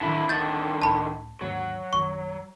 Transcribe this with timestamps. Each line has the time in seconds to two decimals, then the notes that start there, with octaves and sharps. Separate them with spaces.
0.01 A1 D3 D#3 F#3 E4
0.29 D1 D3 D#3 G6 A6
0.82 C#2 A2 A5 B5
1.41 D#2 G#2 D3 F#3
1.93 A#1 F#2 D#3 C#6